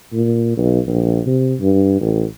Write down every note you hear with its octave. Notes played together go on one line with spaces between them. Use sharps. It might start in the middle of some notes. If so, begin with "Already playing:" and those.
A#2
B1
A#1
C3
G2
A1